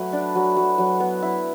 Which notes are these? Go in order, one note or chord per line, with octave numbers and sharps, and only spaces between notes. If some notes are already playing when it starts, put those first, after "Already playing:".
Already playing: F#3 A3 E4 B4
D4
F#3
F#3
F#3
B3
E4